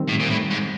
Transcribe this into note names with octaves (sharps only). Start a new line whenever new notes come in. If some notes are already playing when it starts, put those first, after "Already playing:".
Already playing: D#3 G3 C4
A2
A#2
A2
G#2